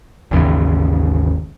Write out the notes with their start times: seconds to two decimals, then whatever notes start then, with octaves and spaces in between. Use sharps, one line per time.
0.31 G#1 D#2 C#3 E3